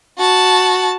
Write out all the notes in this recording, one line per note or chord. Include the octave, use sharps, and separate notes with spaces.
F#4 A5